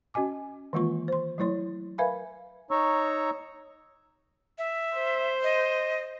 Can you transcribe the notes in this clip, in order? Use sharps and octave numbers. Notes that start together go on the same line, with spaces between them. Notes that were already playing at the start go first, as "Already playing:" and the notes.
C#4 F#4 D#5 G#5 D6
D#3 E3 G#3 A#3 F4 C#6
C5 C6
F#3 A3 E4 C#5 C6
A#4 B4 E5 F5 G#5 B5
D#4 C#5 A#5 C#6 E6
E5
C5
D#5